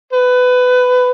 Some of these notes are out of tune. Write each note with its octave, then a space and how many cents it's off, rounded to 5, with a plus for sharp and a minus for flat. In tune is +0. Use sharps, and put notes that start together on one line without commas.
B4 +20